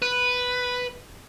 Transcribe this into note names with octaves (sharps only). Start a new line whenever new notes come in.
B4